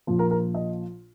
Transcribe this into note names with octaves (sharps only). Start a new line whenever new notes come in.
A#1 A#2 F3
A#4
A#4
D#5